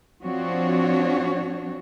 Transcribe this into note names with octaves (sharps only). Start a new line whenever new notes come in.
F3 C4 D4 F#4 C#5